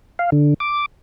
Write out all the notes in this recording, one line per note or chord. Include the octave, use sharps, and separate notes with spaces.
F5
D3
D6